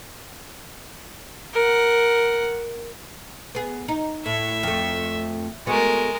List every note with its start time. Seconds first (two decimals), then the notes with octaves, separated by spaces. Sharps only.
1.53 A#4 F#5
3.55 B3 G#4
3.88 D#4
4.26 A2 E5
4.63 F2 A3
5.67 G#3 A3 B3 F#4 A#4